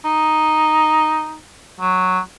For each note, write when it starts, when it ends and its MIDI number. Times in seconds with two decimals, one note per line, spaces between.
0.05 1.39 63
1.80 2.19 54